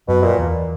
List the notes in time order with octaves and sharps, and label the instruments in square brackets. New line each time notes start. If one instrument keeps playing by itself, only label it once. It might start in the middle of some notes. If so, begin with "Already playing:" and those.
[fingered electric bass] F#2 [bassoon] B2
[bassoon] A#2
[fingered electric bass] E2